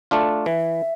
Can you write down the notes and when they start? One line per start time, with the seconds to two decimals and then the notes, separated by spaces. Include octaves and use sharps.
0.11 A3 D4 F4
0.46 E3 E5